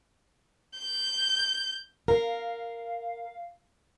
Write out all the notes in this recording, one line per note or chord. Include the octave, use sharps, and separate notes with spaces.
G6
A#4 F5